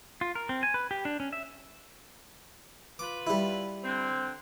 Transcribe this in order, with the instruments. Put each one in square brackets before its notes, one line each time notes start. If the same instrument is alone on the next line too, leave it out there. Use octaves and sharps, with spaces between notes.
[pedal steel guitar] F4
A#4
C4
G#5
B4
G4
D4
C#4
E5
[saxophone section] F4 B4 [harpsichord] D6
[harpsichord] G3 E4
[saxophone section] D3 C4